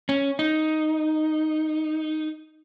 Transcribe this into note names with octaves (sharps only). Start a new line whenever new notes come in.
C#4
D#4